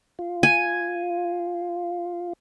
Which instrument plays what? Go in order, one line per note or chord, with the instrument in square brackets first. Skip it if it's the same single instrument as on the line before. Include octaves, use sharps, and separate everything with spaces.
[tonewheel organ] F4
[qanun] G#5